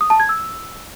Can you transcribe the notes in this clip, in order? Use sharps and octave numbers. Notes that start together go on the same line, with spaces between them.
D#6
A5
G#6
E6